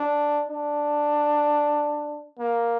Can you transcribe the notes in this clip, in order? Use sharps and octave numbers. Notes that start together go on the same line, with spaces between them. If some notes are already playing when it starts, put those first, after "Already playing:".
Already playing: D4
D4
A#3